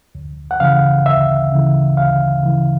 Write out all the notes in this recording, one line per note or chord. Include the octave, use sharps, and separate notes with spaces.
D2
F#5
C#3 E3 F5
D2 E5
C#3 E3
D2 F5
C#3 E3